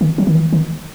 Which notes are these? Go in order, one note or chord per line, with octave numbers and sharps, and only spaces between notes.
D#3
F#3
D#3
E3
D#3